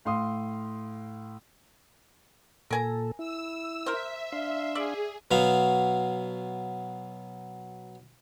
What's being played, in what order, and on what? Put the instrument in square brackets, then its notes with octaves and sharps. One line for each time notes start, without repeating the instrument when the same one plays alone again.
[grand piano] A2 F5 C6 D#6
[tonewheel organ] A#2 A4 [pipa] A#4 G#5 A#5
[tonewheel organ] E4 [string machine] E6
[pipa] A#4 C5 [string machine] E5
[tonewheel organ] D4 F5 C6
[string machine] G#4 [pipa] D5 E5
[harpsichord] B2 F#3 B3 F5